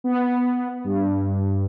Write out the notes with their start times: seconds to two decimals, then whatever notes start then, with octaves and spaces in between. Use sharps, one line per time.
0.04 B3
0.85 G2